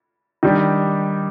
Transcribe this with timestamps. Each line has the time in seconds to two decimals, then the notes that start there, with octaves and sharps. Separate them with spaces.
0.43 D#3 G3 D4 G4